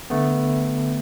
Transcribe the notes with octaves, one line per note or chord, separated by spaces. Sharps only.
D3 A3 B3